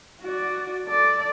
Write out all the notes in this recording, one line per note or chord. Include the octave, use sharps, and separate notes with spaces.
F#4 D5
A4 D5